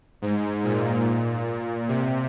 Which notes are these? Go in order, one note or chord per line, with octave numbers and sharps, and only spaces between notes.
G#2
A#2
C3